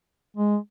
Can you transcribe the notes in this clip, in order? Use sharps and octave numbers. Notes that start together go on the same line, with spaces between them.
G#3